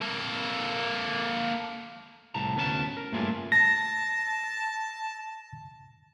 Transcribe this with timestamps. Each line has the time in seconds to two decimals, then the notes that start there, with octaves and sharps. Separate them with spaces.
0.02 A#3 A4
2.34 C2 A2 A5 A#5
2.56 D2 B3 C#4 E4 A5
2.97 A#4
3.12 G2 A3 A#3 C#4 F4 G#4
3.52 A5 A#6